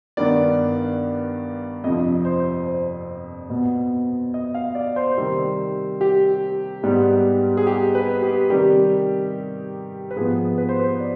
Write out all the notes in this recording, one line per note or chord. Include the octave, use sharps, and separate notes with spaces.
G2 D#3 B3 D5
F2 C3 F3 D#5
C5
C5
B2 B3
D#5
F5
D5
C5
C3 D#3 G3 C4
G4
G#2 G3 B3
G#4
G4
B4
G4
C3 D#3 G3 G4
B4
G#2 F3 B3 G#4
B4
C5
B4
D5